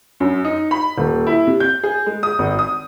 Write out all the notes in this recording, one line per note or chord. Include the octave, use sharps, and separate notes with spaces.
F#2
D#4
B5
D#1
E4
C3
G6
G#4
G#3
D#6
G#1
D#6